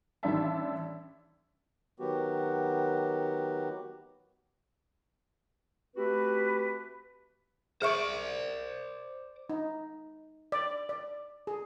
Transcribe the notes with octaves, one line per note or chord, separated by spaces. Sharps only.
A1 D#3 G3 D4 E5 A5
D#3 F#3 B3 F#4 G4
A3 C4 F#4 G4 B4
G#4 C5 D5 E5 C#6
D#4
D5
D5
G#4